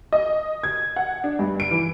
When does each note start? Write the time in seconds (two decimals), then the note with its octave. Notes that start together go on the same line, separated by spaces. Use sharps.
0.12 D#5
0.63 G#6
0.96 F#5
1.24 D4
1.39 G2
1.60 D7
1.71 E3